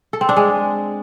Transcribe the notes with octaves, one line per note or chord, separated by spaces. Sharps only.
A4
C4
D4
G#3